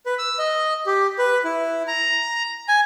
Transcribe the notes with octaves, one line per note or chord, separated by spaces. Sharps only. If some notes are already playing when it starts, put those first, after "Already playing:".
B4
E6
D#5
G4
B4
E4
A#5
G#5